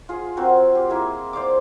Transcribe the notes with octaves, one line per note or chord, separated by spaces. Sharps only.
F4 G#4
C4 F4 F#4 A#4
G4
A#3 E4 G#4
C5 D5 F5 D6